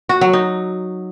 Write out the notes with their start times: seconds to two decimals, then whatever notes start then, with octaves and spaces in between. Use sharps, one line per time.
0.09 F#4
0.21 F#3
0.33 D#4